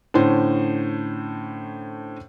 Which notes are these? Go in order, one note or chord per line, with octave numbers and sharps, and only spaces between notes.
A2 D3 C#4 C5